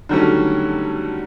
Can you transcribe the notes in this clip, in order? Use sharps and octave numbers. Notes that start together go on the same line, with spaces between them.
D3 D#3 F#3 G3 A3 C#4